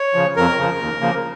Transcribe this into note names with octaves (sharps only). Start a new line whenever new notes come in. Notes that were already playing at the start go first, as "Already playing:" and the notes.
Already playing: C#5
C#3 F3
F2 A#4
C#3 F3
D#2
C#3 F3 A#3